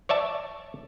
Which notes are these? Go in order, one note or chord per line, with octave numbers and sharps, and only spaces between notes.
C#5 D5 E5 A5